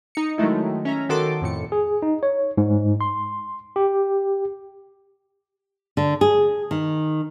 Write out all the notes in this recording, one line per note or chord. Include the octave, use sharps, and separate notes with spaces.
D#4 C#7
D#3 F#3 G#3 A3 E4
C#4 E5 A#5
D#3 F#4 A4 A#4 C6 D6
F2 A2 C#7
G#4
D#4
C#5
G#2
C6
G4
D3
G#4
D#3